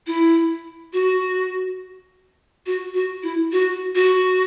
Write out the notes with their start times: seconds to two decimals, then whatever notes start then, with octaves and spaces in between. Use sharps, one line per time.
0.07 E4
0.93 F#4
2.66 F#4
2.94 F#4
3.23 E4
3.52 F#4
3.95 F#4